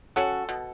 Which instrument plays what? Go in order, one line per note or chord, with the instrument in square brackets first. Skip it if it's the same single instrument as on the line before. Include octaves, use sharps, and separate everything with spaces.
[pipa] F#3 C#4 F#4 [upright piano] A4
[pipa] B2